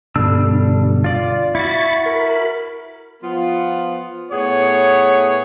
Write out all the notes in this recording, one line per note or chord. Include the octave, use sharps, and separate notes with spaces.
G2 B2 D3 G3 D4 E6
F4 D5
E4 F#4 B5 C#6 A6
A#4 B5
F3 B3 F4
A2 B3 G#4 C#5